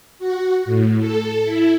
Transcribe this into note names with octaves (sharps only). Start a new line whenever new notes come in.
F#4
A2
A4
E4